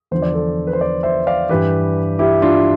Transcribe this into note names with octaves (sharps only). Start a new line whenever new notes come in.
E2 D3 F3 C5
D5
A4 C5
B4
C5
B4 D5
C5 E5
D5 F5
G2 E3 G4 B4
E4 G4
D4 F4